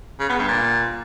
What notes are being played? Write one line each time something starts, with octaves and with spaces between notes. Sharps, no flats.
C#3
B3
G2
A#2